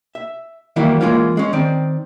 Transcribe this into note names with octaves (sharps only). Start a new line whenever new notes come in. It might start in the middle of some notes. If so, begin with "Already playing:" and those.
E5
D#3 E3 F#3 G3 A#3 E4
E3 G#3 A#3 C#4 F4
G#3 C#4
D#3 C4 D5